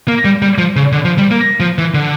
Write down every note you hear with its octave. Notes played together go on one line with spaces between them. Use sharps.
A#3
G3
G3
F3
C#3
D3
F3
G3
A#3
F3
E3
D3